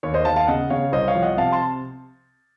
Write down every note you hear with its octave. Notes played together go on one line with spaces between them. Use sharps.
D#2 C#5
C5 D#5
D#2 F5 A5
F5 A5
C#3 D#5 F#5
C#3 C#5 F5
C2 C5 D#5
C#5 F5
F3
D#5 F#5
C3 F5 A5
A5 C6